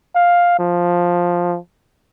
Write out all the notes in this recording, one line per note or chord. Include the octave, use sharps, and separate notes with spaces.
F5
F3